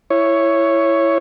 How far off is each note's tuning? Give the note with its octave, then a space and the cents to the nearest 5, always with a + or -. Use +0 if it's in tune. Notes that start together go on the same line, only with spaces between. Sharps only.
E4 +10 C#5 +0